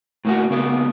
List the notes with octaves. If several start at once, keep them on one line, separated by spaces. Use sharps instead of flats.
A2 A#3 F#4
C#3 A#3 B3